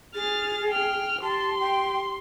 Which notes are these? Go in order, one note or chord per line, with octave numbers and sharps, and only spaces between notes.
G#4 F6 A6
G5 F6
G4 A5 C6
G5